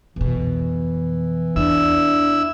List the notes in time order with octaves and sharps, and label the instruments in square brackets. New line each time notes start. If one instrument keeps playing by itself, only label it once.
[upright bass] F2 B2 [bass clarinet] E3
[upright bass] E2 [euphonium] D4 [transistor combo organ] E4 E5 E6